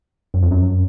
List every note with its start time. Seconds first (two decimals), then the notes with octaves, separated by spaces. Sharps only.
0.34 F#2
0.42 F2
0.51 F#2